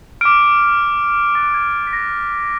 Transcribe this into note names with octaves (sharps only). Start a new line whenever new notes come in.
D6 F6 D7
D6 F#6 A6
G#6
B6
A#6